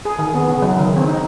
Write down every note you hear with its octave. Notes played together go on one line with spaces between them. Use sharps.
G#4
D#3
B3
C#3
F#3
D#3
C4
D#4